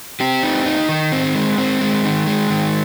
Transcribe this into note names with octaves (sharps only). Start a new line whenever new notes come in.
C4 G4
D#4
D#4
D#3
C4
G#3
C4
G#3
D#3
G#3
D#3